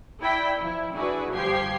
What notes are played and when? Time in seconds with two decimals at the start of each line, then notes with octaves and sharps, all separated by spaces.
0.21 E4 D5 G5 B5
0.59 F3 E4
0.94 D4 E4 F#4 G#4 B4 D5
1.34 G1 F3 G4 G5 G#6 C7